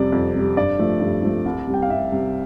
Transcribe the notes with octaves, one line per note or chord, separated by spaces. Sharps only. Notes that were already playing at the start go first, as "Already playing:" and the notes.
Already playing: F2 C3 G3 D5
F2
C3 G3
G2 D5
F3 A3
G2
F3 A3
C2
C3 G3
G5
F5
C2 E5
C3 G3